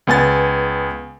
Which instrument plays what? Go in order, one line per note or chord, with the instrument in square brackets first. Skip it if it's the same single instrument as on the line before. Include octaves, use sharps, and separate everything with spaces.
[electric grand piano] C#2 B3 G#5 A6